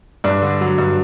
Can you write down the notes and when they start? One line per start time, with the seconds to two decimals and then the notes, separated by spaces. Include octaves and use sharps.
0.24 G2 D4
0.42 D3
0.61 F#3
0.78 G2